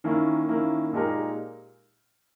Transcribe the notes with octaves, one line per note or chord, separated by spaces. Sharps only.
D#3 A#3 C#4 E4
D#3 A#3 C#4 E4
A#2 G#3 D#4 G4 A#4